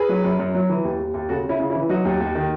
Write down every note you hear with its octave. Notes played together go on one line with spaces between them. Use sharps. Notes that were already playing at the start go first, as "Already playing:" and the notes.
Already playing: G#4 B4
F#3
F#2
F#2
F#3
E3
D#2
D#2
D#2
C#3 F#4 A4
C#3 C#4 E4
C#3
C#4 E4
E3
F#3 D#4 F#4
D#2
D#2
D#3